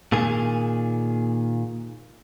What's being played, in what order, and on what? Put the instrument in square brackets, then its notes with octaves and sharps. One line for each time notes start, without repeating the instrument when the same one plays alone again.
[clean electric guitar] A#2 D#3 G#4